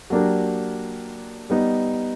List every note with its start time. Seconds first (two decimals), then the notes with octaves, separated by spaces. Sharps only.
0.10 F#3 A#3 D4 G4 A#4
1.50 G3 B3 D#4